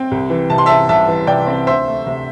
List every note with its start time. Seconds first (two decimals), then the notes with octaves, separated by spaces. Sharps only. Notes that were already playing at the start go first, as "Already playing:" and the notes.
Already playing: C4 G5
0.11 C2
0.30 E3
0.50 C3 A5
0.58 C6
0.66 C4 E5 A5
0.89 C2 E5 A5
1.08 E3
1.27 C3 D5 G5
1.47 C4
1.67 D2 C5 E5
1.87 A3
2.07 C3